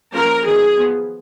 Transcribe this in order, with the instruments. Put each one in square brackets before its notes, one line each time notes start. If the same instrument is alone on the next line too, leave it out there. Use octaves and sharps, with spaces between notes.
[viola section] F3 A#3 C#4 A#4
D#3 F#3 B3 G#4
F3 B3